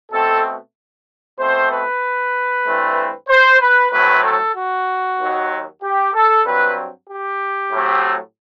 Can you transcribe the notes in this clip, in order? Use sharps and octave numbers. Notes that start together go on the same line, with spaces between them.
B2 A3 C4 A4
B2 A3 C4 C5
B4
G2 E3 A3 C4
C5
B4
A2 F#3 A3 C4 B4
A4
F#4
D#2 D#3 F#3
G4
A4
G2 F#3 C4 B4
G4
A2 F#3 A3 C4